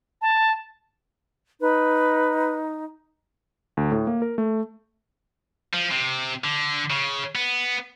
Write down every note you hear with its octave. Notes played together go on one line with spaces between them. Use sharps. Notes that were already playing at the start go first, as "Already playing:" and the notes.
A5
D#4 B4
D2
A2
A#3
A#4
A3
F3
C3
D3
C#3
B3